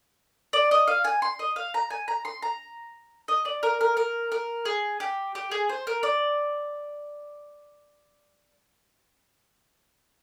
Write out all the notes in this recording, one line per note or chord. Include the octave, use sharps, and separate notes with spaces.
D5
D#5
F5
G#5
C6
D#5
F5
A#5
G#5
A#5
C6
A#5
D#5
D5
A#4
A#4
A#4
A#4
G#4
G4
G4
G#4
C5
A#4
D5